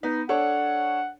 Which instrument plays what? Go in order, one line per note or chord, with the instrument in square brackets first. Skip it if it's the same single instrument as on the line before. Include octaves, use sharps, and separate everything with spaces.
[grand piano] B3 [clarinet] D#4
[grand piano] D4 A4 C#5 [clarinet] F#5